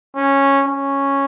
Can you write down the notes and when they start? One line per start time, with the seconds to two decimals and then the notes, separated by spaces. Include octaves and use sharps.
0.16 C#4
0.66 C#4